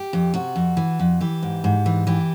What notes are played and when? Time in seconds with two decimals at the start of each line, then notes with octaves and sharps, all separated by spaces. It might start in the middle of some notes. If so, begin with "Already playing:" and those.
Already playing: G4
0.13 F2
0.34 C3 F#4
0.56 F2
0.77 E3
1.00 F2
1.21 E3 G4
1.43 G#2
1.64 G#2
1.86 E3
2.07 E3 G4